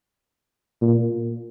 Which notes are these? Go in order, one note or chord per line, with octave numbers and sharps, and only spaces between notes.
A#2